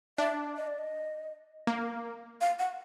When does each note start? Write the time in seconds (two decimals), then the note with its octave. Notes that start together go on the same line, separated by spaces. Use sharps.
0.18 D4 E5
0.57 D#5
0.67 D5
0.78 D#5
1.67 A#3
2.41 F5
2.59 F#5